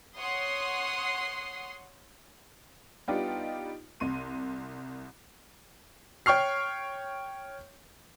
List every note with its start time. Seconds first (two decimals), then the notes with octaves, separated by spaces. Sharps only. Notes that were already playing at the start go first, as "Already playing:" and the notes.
0.17 C#5 F#5 C6 D#6 C7
3.08 G3 B3 D4 D#4 F4 G4
4.00 C2 C6 D#7
6.26 C#5 G5 C#6 F6 C7